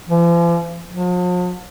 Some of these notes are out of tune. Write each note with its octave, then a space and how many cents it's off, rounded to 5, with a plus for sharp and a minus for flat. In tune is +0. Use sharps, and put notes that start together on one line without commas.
F3 -45
F3 +45